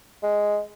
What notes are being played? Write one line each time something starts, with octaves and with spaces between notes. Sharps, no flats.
G#3